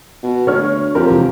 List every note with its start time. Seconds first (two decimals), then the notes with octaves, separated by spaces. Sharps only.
0.23 B2
0.47 D2 C#5 F6
0.95 F2 G4 A#4
1.10 E2 C3